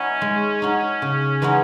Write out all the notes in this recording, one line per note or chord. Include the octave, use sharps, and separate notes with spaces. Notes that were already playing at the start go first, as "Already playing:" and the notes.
Already playing: C#4 D#4 F#4 B4 E5
G#3
D#4 F#4
C#3
E3 G#3 D#4 F#4